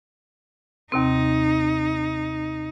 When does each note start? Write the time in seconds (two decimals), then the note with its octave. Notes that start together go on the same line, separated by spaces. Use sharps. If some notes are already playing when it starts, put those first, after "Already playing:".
0.92 D#2 C3 C4 D#4